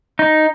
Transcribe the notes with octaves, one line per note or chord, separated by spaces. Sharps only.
D#4